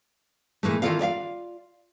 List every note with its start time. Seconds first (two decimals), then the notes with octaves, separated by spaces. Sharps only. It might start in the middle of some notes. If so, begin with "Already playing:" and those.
0.63 A#2 E3 G#3 A3
0.82 D#3 E3 F4 A4 D5 F5
0.99 F4 D5 E5 F5